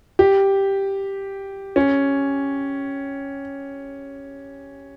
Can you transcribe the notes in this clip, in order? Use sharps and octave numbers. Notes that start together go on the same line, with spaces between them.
G4
C#4